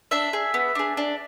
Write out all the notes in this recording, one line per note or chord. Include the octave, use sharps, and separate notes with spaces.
D4 E5
G#4
B3
D4 G#4
D4